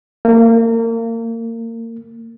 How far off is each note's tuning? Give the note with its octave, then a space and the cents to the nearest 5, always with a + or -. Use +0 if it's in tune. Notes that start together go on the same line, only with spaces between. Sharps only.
A#3 -30